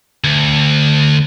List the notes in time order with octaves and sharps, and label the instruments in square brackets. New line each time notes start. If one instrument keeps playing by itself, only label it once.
[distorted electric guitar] D2